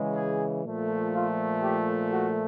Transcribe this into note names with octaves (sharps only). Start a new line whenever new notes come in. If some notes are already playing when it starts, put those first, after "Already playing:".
Already playing: C#3 E3 G#3
G#4
A#2 F3 A3
F4
G4
F#4